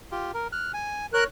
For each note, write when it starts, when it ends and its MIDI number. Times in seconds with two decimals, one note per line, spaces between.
0.11 0.31 65
0.11 0.31 67
0.34 0.47 70
0.52 0.72 89
0.52 0.72 90
0.74 1.06 80
1.14 1.24 70
1.14 1.27 73
1.14 1.24 90